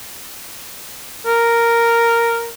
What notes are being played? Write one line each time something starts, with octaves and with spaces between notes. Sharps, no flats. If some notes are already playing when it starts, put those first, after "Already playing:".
A#4